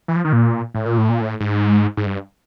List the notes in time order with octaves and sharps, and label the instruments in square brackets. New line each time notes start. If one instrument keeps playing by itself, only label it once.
[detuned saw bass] E3
F3
D#3
A#2
A2
A#2
A2
A#2
A2
G#2
G#2
G2